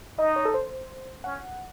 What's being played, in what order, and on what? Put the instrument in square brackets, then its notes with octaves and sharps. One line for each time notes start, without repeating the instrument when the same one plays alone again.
[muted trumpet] D#4 [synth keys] D#5
[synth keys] C#5
A4
C5
[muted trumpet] C#4 [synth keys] F#5